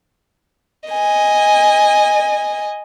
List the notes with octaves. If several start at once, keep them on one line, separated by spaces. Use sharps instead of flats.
D#5 G#5